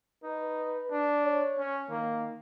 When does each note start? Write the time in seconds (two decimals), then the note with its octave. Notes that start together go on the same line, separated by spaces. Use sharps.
0.23 D#4 B4
0.91 D4
1.24 C#5
1.59 C#4
1.90 D#3 A#3